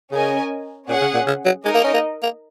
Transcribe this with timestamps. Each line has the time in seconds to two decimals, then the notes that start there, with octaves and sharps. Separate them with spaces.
0.11 C#3 C#4 A#4 D#5 G#5
0.88 A#2 C#4 G#4 F#5
1.02 C#3
1.14 A#2
1.27 C#3
1.45 F#3
1.65 G#3 D#4 A#4 D#5
1.75 A#3
1.84 C#4
1.94 A#3
2.23 A#3